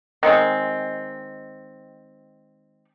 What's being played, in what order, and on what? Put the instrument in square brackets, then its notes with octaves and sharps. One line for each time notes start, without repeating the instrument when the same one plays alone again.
[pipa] D#3 G#3 C4